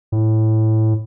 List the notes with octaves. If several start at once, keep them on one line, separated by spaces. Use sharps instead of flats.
A2